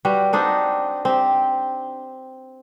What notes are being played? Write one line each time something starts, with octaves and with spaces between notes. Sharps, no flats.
G3 F#4 B4
C4 D4 D#4 F#5
C4 G4